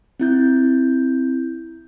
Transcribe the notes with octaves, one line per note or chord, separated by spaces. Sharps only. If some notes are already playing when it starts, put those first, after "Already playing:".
C4 E4 G6